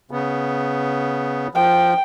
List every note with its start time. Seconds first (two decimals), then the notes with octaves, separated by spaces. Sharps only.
0.11 C#3 B3
1.55 F3 G5